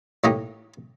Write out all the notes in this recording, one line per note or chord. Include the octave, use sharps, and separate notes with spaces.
A2 A#3 D#4 G4